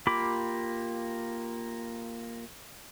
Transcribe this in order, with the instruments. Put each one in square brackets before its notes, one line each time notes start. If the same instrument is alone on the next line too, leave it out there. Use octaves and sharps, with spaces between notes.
[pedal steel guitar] A#3 F4 G4 B5 D6